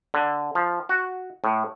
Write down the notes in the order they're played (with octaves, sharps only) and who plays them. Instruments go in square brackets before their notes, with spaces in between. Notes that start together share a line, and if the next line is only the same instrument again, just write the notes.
[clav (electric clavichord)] D3
F3
F#4
A2